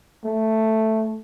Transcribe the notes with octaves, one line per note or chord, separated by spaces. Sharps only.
A3